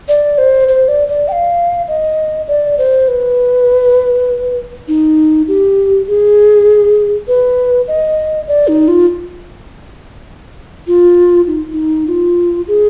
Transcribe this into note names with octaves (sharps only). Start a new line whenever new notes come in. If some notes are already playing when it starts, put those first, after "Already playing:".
D5
C5
C5
D5
D5
G5
F5
D#5
D5
C5
B4
D#4
G4
G#4
B4
D#5
D5
D#4
F4
F4
D#4
D#4
F4
G#4